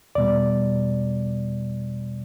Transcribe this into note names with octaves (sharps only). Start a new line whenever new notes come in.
E2 B2 G3 D5